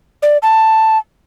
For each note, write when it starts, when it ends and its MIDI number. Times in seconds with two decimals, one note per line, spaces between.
0.23 0.37 74
0.43 0.98 81